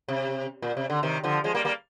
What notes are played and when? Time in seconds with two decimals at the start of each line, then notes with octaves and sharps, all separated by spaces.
0.08 C3
0.62 A#2
0.77 C3
0.90 D3
1.03 C3 D#3
1.24 D3 F3
1.44 F3 G#3
1.55 G3 A#3
1.65 G3 A#3